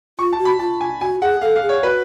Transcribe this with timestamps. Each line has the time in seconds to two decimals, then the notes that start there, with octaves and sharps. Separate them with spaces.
0.19 F4 C#6
0.33 A5
0.38 F#4
0.45 B5
0.59 F4 A5
0.81 G#5
1.01 F#4 G#5
1.21 G#4 F#5
1.41 A4 F5
1.56 F5
1.62 G#4
1.69 C#5
1.83 F#4 B4